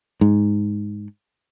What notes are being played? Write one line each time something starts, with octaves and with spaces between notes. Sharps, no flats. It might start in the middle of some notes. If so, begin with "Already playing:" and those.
G#2